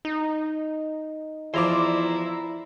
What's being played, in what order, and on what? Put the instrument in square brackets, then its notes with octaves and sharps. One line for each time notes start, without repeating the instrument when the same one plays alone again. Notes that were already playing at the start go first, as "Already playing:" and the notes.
[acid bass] D#4
[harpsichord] E2 F3 [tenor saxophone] E4 [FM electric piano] D5 A#5 C6